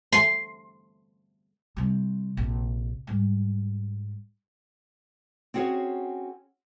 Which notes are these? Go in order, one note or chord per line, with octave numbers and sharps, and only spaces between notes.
C6
C3 G3
A#1 C3
G#2 G3
C4 C#4 F#4 G#4 C#5 F#5